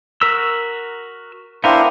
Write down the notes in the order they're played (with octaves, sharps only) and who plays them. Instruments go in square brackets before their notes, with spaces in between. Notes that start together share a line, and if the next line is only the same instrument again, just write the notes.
[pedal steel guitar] F#4 A#4 E6 [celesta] B6
[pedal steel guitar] B3 A#4 [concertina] D4 E4 C5 [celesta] F5 G5 C6